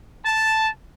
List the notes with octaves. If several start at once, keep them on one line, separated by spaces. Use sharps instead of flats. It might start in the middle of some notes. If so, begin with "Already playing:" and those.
A5